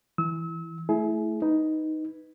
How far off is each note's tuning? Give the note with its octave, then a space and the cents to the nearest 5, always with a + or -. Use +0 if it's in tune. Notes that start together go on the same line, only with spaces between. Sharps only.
E3 +0 E6 -35
A3 +0 E4 +0 G#4 +35
D#4 +5 B4 +0